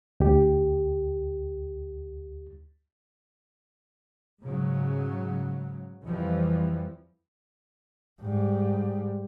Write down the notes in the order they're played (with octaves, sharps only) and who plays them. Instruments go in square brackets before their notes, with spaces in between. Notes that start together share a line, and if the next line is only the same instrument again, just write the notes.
[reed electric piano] D2 G4
[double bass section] G#2 C#3 F#3
F2 E3 F3 G3
[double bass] G#2 G3